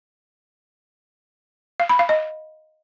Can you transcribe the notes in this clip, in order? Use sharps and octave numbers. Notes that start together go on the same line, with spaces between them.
F5
B5
F5
D#5